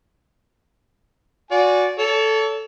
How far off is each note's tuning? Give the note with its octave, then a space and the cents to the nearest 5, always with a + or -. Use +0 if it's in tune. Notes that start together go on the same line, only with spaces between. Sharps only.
F#4 -25 D5 -20 G#5 +0
A4 +0 C#5 +40